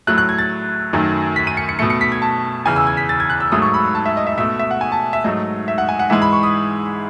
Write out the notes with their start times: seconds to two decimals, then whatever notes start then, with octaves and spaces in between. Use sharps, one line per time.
0.07 A2 F#3 A3 F#6
0.18 F#6
0.29 G#6
0.39 A6
0.93 F#2 D#3 F#3 A3
1.36 B6
1.47 D#7
1.57 C#7
1.69 C#7
1.79 B2 A3 C#7
1.90 C#7
2.01 B6
2.12 G#6
2.22 A5
2.65 E2 C#3 E3 G#5
2.76 E6
2.87 G#6
2.97 B6
3.09 A6
3.20 G#6
3.30 F#6
3.40 E6
3.52 G#2 F#3 A3 D#6
3.62 C#6
3.74 B5
3.95 A5
4.06 E5
4.17 D#5
4.27 E5
4.38 B2 A3 E5
4.59 E5
4.71 F#5
4.81 G#5
4.92 A5
5.13 E5
5.24 G#2 F#3 A3 D#5
5.68 E5
5.78 F#5
5.89 G#5
5.99 F#5
6.10 G#2 E3 G#3 E5
6.22 B5
6.33 C#6
6.43 D#6